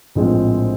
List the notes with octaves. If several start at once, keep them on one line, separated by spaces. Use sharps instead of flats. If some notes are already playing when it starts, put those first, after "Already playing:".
A#1 A2 F3 G#3 C4